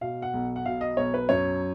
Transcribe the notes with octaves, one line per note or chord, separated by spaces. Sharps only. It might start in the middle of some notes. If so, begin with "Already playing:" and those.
B2 F5
F#5
B1
F#5
B2 F5
D#5
B1 C#5
B4
F#2 C#5